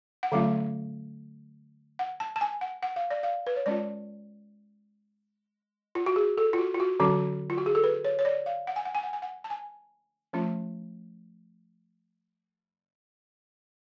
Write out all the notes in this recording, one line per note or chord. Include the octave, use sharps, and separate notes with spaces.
F#5
D3 F#3 A3 C#4 F4 F5
F#5
A5
A5
G#5
F#5
F#5
F5
D5
F5
B4
C#5
G#3 C#4 F4 D5
F4
F#4
G#4
A4
F4
F#4
F4
F#4
D3 F#3 C#4 F#4
F4
F#4
G#4
A4
B4
C#5
C#5
D5
F5
F#5
G#5
F#5
G#5
F#5
G#5
F#5
A5
G#5
F3 A3 C#4 F4